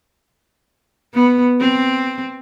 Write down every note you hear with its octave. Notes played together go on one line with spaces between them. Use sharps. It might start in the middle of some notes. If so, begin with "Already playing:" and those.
B3
C4